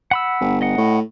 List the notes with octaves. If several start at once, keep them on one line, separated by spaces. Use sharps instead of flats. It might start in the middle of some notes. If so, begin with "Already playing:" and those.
F#5 B5 E6
G1
D#5 F#5
A2